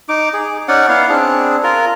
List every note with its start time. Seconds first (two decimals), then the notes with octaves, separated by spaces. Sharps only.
0.09 D#4 D6
0.33 G#4
0.68 C#4 D#4 D5 F#5
0.89 B3 E4 F5
1.09 C4 D4 G#4
1.63 F4 A#4